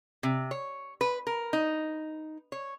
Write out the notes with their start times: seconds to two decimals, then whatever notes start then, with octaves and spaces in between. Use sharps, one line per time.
0.23 C3
0.51 C#5
1.01 B4
1.27 A#4
1.53 D#4
2.52 C#5